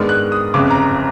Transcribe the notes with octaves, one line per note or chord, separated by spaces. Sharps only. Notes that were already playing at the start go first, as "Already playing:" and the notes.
Already playing: G#2 D#3 G#3 B3 D4 F6
F#6
D#6
G1 F2 C#3 D6
A#5